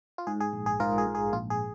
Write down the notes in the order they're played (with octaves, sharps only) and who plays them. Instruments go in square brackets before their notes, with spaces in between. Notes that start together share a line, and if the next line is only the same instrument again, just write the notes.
[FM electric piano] F4
G#2 G#4
G#4
A#1
G#4
G#2 F4 A#4
G#4
G#2
G#4
A#1 F4
G#4